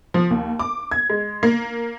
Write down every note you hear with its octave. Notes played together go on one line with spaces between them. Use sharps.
F3
D#2
D6
G#6
G#3
A#3